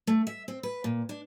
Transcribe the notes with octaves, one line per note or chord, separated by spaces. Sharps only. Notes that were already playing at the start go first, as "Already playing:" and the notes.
A3
E5
C4
B4
A#2
D4